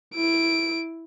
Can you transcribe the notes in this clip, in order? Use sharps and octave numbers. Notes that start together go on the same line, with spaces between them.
E4 D7